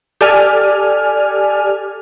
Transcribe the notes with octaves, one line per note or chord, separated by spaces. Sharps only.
G4 A4 D5 G#5 F6